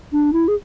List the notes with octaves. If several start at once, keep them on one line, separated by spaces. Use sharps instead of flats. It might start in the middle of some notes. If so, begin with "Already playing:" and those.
D4
E4
G#4